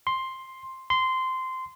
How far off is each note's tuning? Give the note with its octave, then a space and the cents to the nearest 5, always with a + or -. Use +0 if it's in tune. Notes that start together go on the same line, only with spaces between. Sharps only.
C6 +5
C6 -15